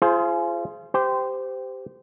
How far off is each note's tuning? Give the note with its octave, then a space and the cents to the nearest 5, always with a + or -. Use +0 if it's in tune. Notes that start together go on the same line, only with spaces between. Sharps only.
F4 -30 G#4 +25 C5 +0
G4 +0 C5 -20